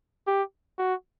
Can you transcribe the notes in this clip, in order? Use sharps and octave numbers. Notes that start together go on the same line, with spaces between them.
G4
F#4